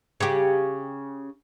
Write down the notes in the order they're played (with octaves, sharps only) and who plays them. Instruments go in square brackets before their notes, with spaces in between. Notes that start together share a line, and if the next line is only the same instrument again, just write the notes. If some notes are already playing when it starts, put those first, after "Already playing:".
[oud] C#3 G4